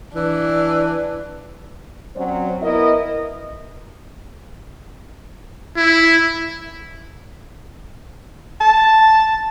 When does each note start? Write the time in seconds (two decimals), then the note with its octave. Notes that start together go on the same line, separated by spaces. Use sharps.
0.15 E3 D4
2.16 F#3 C4 C#4 F#4 C5 D5
2.62 B3 E4 A#4 D#5
5.77 E4
8.60 A5